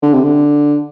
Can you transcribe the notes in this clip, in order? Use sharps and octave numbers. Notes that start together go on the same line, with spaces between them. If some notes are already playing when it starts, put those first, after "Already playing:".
D3
C3
D3